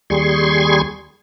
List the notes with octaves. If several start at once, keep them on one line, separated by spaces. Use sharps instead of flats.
D#2 G3 G#4 C6 C#6 G#6